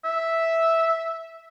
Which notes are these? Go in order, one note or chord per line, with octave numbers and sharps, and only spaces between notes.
E5